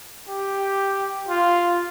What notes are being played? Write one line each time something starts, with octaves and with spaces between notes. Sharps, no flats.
G4
F4